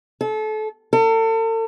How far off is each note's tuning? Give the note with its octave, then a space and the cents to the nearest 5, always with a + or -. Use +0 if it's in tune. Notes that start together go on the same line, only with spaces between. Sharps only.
A4 -30
A4 +40